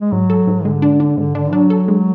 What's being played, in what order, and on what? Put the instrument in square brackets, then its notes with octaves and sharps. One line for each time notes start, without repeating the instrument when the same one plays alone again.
[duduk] G#3
[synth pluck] G#2 [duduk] F#3
[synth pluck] A4
G#2
[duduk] D3 [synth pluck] G#3
[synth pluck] D4
D4
[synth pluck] G#2 [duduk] D3
[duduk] D3 [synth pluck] D4
[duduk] F#3 [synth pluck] D4
[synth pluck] A4
G#3